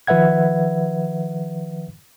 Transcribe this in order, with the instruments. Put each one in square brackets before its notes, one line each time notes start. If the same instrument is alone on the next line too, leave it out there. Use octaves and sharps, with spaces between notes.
[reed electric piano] D#3 F3 B4 E5 F#5 G#6